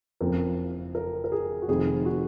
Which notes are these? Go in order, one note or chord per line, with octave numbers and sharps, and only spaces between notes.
F#1 F2 C#3 F3 A#4
A#4
A#4
G#4
F#4
F1 F2 D#3 G#4
F#4